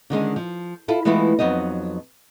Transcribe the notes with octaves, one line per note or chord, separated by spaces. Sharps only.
D3 D#3 G#3 C#4
F3
E4 F4 A4
E3 G#3 A3 B3 E4 F4
F2 F#3 B3 D#4 D#5